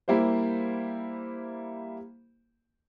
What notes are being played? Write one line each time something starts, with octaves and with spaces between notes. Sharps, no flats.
G3 A#3 E4 G4 C5